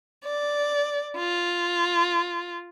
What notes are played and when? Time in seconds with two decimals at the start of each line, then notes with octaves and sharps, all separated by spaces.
0.25 D5
1.18 F4